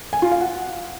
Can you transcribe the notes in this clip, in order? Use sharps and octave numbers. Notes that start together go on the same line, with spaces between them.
G#5
F4
F5
F#5